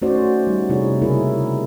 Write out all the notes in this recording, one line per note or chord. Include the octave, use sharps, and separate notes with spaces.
A3 C#4 D#4 F#4 C5 D5
G3 D#4
C3 D#4 E4 F#4 G#4 C#5
C#3 A#3 E4 G4 G#4 A#4